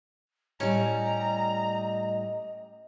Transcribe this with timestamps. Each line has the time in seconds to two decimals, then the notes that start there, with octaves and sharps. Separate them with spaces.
0.60 A2 G3 C#4 D#5 A#5